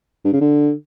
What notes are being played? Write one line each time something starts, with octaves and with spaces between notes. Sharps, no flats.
G2
C#3
D3